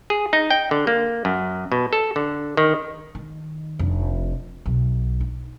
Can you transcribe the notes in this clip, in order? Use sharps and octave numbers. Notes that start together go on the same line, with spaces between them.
G#4
D#4
G5
D3
A#3
F#2
B2
A4
D3
D#3
D#3
F1 D4
B1
D#4